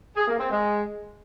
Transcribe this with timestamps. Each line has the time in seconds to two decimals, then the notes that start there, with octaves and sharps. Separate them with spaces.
0.17 G#4
0.28 A#3
0.39 C4
0.51 G#3